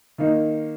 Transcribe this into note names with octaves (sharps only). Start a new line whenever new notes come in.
D#3 A#3 D#4